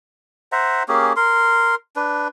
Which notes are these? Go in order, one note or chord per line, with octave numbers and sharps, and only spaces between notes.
C5 E5 F#5 A#5
A#3 C#4 G4 G#4
A#4 C6
D4 B4